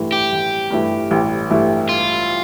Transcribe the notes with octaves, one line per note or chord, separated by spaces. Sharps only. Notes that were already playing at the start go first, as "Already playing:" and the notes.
Already playing: A1 G2 E3 A3 E4
G4
A1
G2 E3 A3 E4
A1
G2 E3 A3 E4
F4